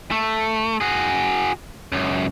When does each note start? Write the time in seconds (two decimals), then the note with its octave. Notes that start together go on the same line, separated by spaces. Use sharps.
0.11 A3
0.81 F#4 G#4
1.92 C#2 F#2